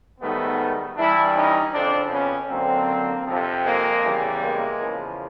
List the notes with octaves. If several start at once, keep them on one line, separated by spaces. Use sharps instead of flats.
G#2 D#3 G3 A3 B3
G2 E3 G3 D4 E4
C#4 D#4
F2 C#3 F3 C4 D4
B3 C#4
F#2 D3 F#3 A#3 C4
F2 C3 F3
G#3 A#3
E2 C#3 E3 G3
G#3 A#3
E2 C#3 F3